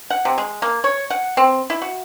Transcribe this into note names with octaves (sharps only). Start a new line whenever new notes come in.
F#5
C3
G#3
A#3
C#5
F#5
C4
E4
F#4